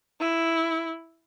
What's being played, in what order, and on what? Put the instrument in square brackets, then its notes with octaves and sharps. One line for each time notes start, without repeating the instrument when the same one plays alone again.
[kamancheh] E4